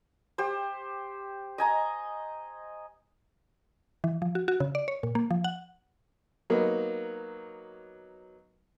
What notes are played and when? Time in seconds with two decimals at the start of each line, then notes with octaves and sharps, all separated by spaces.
0.38 G4 C5
1.58 D#5 G#5 A#5
4.04 E3
4.22 F3
4.35 F#4
4.48 F#4
4.60 C#3
4.75 D5
4.88 C#5
5.03 A#2
5.15 A#3
5.31 F3
5.44 F#5
6.50 F#3 A#3 B3 D#4